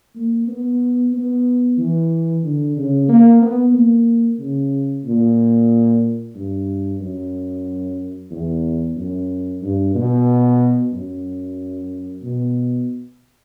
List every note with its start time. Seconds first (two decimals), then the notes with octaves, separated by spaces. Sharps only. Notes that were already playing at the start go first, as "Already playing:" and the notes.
0.15 A#3
0.48 B3
1.13 B3
1.78 E3
2.44 D3
2.76 C#3
3.08 A#3
3.42 B3
3.74 A#3
4.39 C#3
5.05 A#2
6.35 G2
7.00 F#2
8.31 E2
8.97 F#2
9.61 G2
9.94 B2
10.92 F#2
12.23 B2